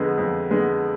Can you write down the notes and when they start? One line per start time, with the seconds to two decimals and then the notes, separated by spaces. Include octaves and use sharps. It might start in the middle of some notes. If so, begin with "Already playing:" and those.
Already playing: F2 D3 G#3 B3
0.18 F2
0.50 D3 G#3 B3